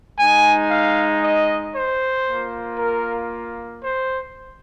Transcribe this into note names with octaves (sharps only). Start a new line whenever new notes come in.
G#3 D#4 G#5
F5
D#5
C5
A#3 F4
A#4
C5